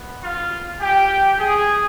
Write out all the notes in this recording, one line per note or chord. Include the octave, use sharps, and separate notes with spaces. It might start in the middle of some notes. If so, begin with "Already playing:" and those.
Already playing: B3
F4 F5
G4 G5
G#4